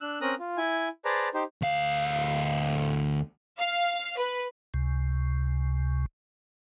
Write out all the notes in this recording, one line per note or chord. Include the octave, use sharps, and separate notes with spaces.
D4 E6 F#6
C4 C#4 A#4 A#5 D#6 F#6
F4
E4 G#5
G#4 B4 C5 D5 A5 A#5
D#4 G4 C5
D2 F5
F5
B4
C#2 C3